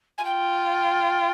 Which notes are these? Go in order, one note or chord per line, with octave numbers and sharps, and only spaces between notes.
G#5
F4 G5